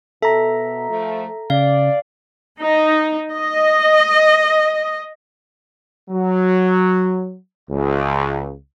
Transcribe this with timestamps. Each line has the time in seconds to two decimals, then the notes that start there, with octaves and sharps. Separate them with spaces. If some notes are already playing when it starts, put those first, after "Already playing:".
0.22 B2 A4 E5 A#5
0.89 F3 A3
1.50 C#3 D5 F5
2.61 D#4
3.33 D#5
6.10 F#3
7.70 C#2